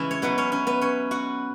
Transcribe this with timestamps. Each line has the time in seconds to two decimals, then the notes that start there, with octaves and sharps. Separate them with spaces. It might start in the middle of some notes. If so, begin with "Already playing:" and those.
Already playing: C#3 E3 G#3 C#4 E4
0.11 C#5
0.22 B2 F#3 B3 B4
0.38 C#4 C#5
0.52 C#4 C#5
0.67 B3 B4
0.81 C#4 C#5
1.11 F#4 F#5